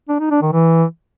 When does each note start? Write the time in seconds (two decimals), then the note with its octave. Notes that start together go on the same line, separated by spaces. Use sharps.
0.08 D4
0.20 D#4
0.31 D4
0.42 D#3
0.53 E3